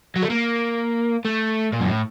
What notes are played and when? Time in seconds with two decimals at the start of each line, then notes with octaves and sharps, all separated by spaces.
0.16 F#3
0.23 A3
0.30 A#3
1.25 A3
1.73 A#2
1.80 F#2
1.88 A2